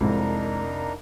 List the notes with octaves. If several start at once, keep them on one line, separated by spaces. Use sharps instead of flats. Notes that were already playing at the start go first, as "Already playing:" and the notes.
C2 F2 G#3 D4 D#4 A#4